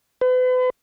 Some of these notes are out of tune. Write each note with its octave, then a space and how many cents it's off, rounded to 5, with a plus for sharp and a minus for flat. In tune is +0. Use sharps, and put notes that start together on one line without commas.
B4 +40